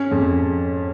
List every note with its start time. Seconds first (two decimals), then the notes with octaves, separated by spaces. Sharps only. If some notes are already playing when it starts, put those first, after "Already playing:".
Already playing: C#4
0.11 F2